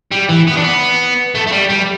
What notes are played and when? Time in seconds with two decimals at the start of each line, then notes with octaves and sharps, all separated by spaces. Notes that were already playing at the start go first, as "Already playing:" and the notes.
0.11 G3
0.29 E3
0.47 B3
0.57 D4
0.64 B3
1.35 A3
1.47 A3
1.52 G3
1.69 G3